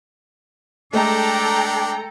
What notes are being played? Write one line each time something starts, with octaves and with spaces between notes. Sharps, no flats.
G#3 A3 D4 A4 G5 A#5 D6